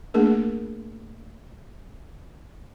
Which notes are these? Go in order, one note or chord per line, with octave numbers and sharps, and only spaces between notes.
A3 A#3 D4 G#4 A#4